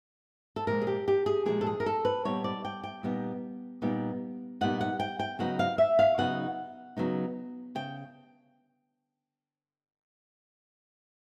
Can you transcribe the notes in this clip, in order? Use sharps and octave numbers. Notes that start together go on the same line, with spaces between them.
A4
A#2 F3 G#3 A#4
G#4
G4
G4
G#4
A#2 F3 G#3 G#4
A4
G#4
A#4
A4
B4
A#2 G3 B3 D#4 C#5
D5
G5
G5
A#2 G3 B3 D#4
A#2 G3 B3 D#4
A#2 G3 B3 D#4 F#5
F#5
G5
G5
C#3 F#3 B3 D#4 F#5
F5
E5
F5
C#3 F#3 B3 D#4 F#5
C#3 F#3 B3 D#4
C#3 G5